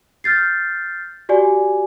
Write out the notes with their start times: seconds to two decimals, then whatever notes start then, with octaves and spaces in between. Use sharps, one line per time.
0.24 F6 G6 A6 C7
1.29 F#4 G4 D5 G#5